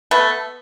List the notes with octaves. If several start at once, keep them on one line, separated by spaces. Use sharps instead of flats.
A3 B3